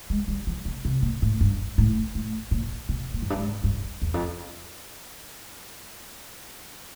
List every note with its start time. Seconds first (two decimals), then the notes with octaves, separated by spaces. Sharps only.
0.10 G#3
0.28 G3
0.47 F3
0.65 B2
0.85 C3
1.02 A#2
1.22 A2
1.41 G2
1.78 A2
2.15 A2
2.51 A#2
2.89 B2
3.14 A#2
3.22 F#2
3.30 G2
3.39 G#2
3.64 G2
4.02 E2
4.14 F2